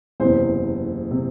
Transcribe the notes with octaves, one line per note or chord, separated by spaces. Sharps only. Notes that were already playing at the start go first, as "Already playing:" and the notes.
F#1 E2 C3 C5
C3